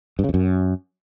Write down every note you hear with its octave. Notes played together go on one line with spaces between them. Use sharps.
G2
C#3
F2
F#2